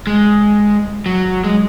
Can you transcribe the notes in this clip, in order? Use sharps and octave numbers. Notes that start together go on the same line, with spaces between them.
G#3
F#3
G#3